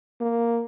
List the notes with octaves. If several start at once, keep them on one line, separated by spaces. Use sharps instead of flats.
A#3